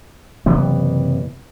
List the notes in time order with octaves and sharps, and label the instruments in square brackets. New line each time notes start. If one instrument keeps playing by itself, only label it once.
[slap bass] F#1 C3 E3 B3